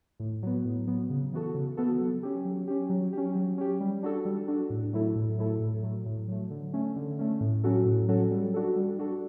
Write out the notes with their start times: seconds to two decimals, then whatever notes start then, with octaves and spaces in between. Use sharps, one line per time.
0.20 A2
0.43 F#3 B3
0.65 A2
0.87 F#3 B3
1.10 C#3
1.33 E3 B3 F#4 A4
1.54 C#3
1.77 E3 B3 F#4 A4
2.00 F#3
2.23 C#4 G4
2.45 F#3
2.67 C#4 G4
2.89 F#3
3.13 C#4 G4
3.35 F#3
3.58 C#4 G4
3.80 G3
4.03 D4 F#4 A4
4.25 G3
4.47 D4 F#4 A4
4.70 A2
4.93 F#3 A3 E4 A4
5.15 A2
5.38 F#3 A3 E4 A4
5.60 A2
5.83 F#3 A3
6.05 A2
6.28 F#3 A3
6.50 D3
6.74 A3 C#4
6.96 D3
7.19 A3 C#4
7.41 A2
7.64 F#3 C#4 F#4 A4
7.85 A2
8.08 F#3 C#4 F#4 A4
8.31 G3
8.54 D4 F#4 A4
8.76 G3
8.99 D4 F#4 A4